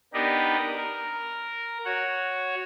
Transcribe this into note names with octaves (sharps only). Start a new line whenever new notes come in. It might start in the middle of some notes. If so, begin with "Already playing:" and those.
B3 D4 D#4 G4 A#4 B4
A#4
F#4 C#5 F#5